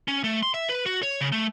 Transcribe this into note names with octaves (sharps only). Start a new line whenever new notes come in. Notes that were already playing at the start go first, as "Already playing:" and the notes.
C#4
A3
C6
E5
B4
F#4
C#5
C#3
A3